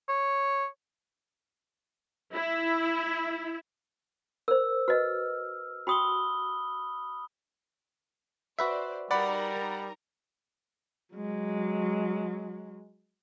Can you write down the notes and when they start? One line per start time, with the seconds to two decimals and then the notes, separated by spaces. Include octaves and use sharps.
0.08 C#5
2.34 E4
4.48 A#4 C5 E6
4.88 F#4 B4 D#5 F6
5.87 F#4 G5 B5 C6 D#6 G7
8.59 F#4 B4 C5 D5 E5
9.11 G3 D#4 A#4 D5 F#5 A#5 B5
11.14 F#3 G#3